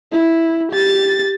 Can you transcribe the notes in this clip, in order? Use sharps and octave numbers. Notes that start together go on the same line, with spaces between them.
E4
G4 A6